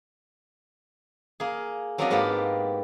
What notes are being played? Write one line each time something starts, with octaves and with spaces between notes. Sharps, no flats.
A#3 G#4
F#3 A#3 C4 D4 F4 D#5
G#2 A#3 B3 F4 G4